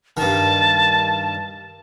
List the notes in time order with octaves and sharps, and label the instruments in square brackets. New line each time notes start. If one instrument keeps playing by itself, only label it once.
[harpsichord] G2 D#3 [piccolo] A5